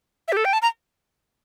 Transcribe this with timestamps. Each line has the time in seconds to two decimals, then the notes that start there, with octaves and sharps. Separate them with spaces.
0.28 E5
0.32 G4
0.37 A4
0.45 G5
0.53 A5
0.62 A#5